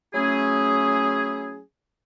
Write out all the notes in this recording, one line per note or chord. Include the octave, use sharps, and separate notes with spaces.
F#3 A3 C#4 E4 G#4